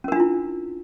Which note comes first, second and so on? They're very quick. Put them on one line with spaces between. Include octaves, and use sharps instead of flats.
C#4 A#4 D4 F4 E4